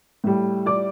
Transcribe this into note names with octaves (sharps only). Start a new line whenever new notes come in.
A2 G3
D5 D6